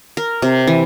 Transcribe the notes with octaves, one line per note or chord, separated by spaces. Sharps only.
A#4
C3
E3